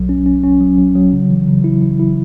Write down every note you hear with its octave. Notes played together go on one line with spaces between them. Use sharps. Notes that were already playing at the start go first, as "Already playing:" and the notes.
Already playing: B1 F#3
C#4
C#4
C#4
F#3
F#3
F#3
C#3
E3
C#3
E4
E4
E4